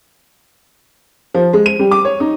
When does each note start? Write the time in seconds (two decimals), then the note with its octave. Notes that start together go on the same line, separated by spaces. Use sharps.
1.34 F3
1.53 G#3
1.66 D#7
1.79 G3
1.91 D6
2.05 C#5
2.20 D#4